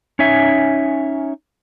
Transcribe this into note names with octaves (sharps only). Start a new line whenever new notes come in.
C#4 D#4 C#5 E5 G#5